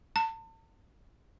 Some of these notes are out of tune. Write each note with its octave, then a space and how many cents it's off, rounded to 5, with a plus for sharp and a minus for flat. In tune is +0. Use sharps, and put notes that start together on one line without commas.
A5 +40